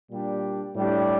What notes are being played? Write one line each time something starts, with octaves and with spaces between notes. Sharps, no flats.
A#2 G3 D4 G4
A2 G3 D4 G4